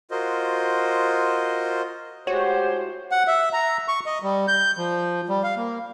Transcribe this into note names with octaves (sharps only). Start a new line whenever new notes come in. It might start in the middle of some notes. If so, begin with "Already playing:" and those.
F4 F#4 A#4 C5 D#5
A2 G#3 F#4 G4 C5 C#5
F#5
E5
A#5
C#6
D#5
G3
G6
F3
G3
F5
A#3